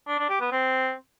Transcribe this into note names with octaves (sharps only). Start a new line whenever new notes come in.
D4
D4
G4
B3
C4